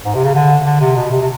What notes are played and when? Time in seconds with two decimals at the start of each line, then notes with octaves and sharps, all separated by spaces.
0.05 G#2
0.14 C3
0.25 C#3
0.35 D3
0.66 D3
0.81 C3
0.96 B2
1.11 C3
1.22 C3